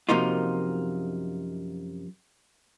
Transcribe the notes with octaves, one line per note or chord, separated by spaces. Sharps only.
F#2 C3 F3 A#3 D#4 F4